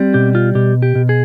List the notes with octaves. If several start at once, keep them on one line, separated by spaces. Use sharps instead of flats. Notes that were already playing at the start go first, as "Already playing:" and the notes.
Already playing: G3 C4
B2 G4
F4
B2 G4
G4
B2
G#4